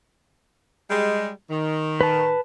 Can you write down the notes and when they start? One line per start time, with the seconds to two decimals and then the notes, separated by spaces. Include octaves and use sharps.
0.90 G3 G#3
1.50 D#3
2.01 B4 A5